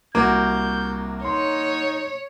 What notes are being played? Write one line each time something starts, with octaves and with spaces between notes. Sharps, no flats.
C2 A#3 F#4 D6 G6 G#6
D#4 C#5 C6